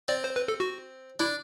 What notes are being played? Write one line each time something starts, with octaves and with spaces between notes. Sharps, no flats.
C4 D5
C5
B4
A4
F#4
D4 E4